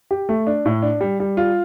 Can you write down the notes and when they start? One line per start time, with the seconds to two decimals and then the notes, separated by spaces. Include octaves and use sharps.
0.11 G4
0.29 A3
0.47 D4
0.65 A2
0.82 D4
1.01 G3
1.20 G3
1.37 F4